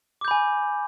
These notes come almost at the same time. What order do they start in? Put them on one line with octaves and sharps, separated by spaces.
D6 G6 B5 G#5